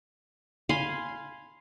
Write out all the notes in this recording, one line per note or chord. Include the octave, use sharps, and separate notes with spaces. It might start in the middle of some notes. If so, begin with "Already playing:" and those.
F5 G#5 B5 C6